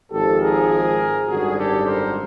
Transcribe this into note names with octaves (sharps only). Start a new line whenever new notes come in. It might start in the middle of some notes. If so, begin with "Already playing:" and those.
G#1 G#2 F3 G4 A4
G#4 A#4
G#1 F#2 D3 G3 F#4 G#4
G4 A4
A#4 C5